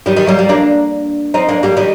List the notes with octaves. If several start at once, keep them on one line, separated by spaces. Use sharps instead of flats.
D#3 G3
D#3 G3
G3 A#3
G3 A#3
A#3 D4
C4 D#4
A#3 D4
G3 A#3
D#3 G3